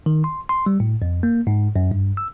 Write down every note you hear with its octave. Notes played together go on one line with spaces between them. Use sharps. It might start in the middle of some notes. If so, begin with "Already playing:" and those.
D#3
C6
C6
G3
A2
F2
A#3
G#2
F#2
G2
E6